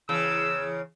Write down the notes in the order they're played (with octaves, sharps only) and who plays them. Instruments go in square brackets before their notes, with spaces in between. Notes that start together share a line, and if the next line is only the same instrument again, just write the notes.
[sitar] E2 C#3 [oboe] E6